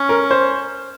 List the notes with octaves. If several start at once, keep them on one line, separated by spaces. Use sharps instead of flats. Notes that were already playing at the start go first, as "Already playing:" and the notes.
Already playing: C#4
A#4
C5